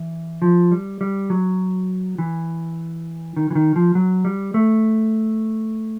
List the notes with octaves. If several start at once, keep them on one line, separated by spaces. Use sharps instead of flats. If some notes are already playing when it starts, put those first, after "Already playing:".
Already playing: E3
F3
G3
G3
F#3
E3
D#3
E3
D#3
F3
F#3
G3
A3